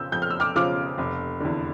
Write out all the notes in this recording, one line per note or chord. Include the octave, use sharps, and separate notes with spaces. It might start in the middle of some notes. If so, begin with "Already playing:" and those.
Already playing: F2 C#3 F3 C#4 F4 E6 G6
F2 G6
F6
E6
D6 F6
C#3 F3 C#4 F4 D6 F6
F1
E2 D3